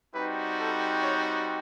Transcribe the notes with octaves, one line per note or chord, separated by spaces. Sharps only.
G3 C4 D#4 F#4 B4
A4
C#5